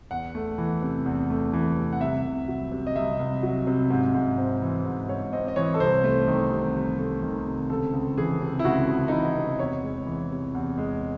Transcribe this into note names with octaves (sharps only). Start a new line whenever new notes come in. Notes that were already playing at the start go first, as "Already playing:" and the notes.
E2 F#5
A3
E3
C3
E2
A3
E3
C3
F#5
C2 E5
C2
F#3
C3
D#5
C2 E5
C2
F#3
C3
G#2
G#2
C4
E3
G#2
G#2 C#5
C4 D#5
D#5
E3 C#5
A4
C2 C5
A3
D#3
C3
C2
A3
D#3
C3
C#2 A4
C#2
E3 G#4
C3
E4
C#2 F#4
C#2
D#4
E3 E4
C3
E2 C#5
G#3
E3
C3
E2
G#3